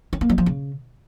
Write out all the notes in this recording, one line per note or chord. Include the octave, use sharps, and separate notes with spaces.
C#4
A#3
F#3
F3
C#3